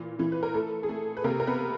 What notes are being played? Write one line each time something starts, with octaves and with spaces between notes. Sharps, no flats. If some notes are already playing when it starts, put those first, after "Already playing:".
Already playing: A#2 E3
E3
B4
A#4
A3 A4
G#4
A3 A4
B4
C3 A#3 A#4
A#4
B3 B4